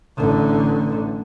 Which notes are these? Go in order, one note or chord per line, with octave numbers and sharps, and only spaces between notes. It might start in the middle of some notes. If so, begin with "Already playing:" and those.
A1 D3